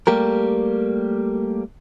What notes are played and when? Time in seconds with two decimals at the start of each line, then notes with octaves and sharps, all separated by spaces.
0.07 G3 A3 A#3 G4 A#4